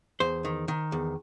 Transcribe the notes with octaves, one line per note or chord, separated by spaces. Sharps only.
E2 C5
D#3
D#3
E2